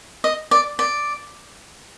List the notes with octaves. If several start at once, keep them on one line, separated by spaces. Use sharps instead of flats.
D#5
D5
D5